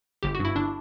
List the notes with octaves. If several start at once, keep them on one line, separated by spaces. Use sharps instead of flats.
G1 G4
F#4
G2
E4
G1 D4